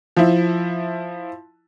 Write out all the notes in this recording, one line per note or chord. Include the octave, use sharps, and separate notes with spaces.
F3 E4